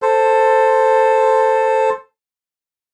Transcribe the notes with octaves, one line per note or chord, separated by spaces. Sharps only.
A4 C5